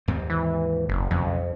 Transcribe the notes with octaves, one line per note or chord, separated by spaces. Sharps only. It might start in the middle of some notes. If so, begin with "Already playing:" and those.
D#2 G#2 C4
E3
F#1
B1 F2 C#3